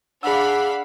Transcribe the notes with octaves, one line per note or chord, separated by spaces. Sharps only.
D4 G#4 F5 F#5 B5 E6